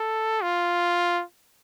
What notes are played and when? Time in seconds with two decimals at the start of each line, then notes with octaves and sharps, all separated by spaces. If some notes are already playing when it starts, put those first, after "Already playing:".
Already playing: A4
0.42 F4